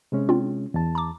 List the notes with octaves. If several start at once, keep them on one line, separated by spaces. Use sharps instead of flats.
C3 G#3 C#4
C4 D4 F4
E2 A5
A#5 D6